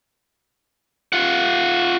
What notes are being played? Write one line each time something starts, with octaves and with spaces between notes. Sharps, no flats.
F4 F#5